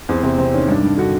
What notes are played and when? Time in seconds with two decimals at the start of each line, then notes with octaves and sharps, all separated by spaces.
0.09 E2 C4
0.23 C3 C4
0.38 C3 C4
0.54 D#3 C#4
0.69 G2 D4
0.83 G2
0.98 D3 F#4